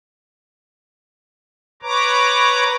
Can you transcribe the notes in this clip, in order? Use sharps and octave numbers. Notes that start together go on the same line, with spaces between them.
B4 C#5 A#5 D6